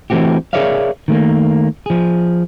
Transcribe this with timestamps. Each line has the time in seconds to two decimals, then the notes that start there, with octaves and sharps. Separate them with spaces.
0.10 E3 A3 C4 F#4 G4
0.53 G#4 A#4 C#5 D5 E5 F5
1.08 D#3 A3 A#3
1.86 F3 G#4